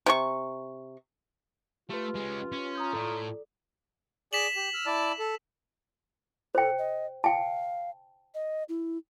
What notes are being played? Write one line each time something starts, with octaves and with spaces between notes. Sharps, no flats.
C3 F4 C#6
A3 F4 G4 B4
G#3 C#4
C#4
A#5 D#6 G6
A2 A4 D5
G#4 D5 B6 E7 F#7
G4
E6 F6
E4 D5 A5
A4
A4 C5 G5
D#5
F5 G5 A5
D#5
E4